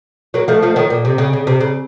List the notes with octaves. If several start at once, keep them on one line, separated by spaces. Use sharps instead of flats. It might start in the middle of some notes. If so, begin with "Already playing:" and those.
F#3 A#3
F3 A3
F3 A3
D#3 F#3
A#2
C3
C#3
C#3
C3
C#3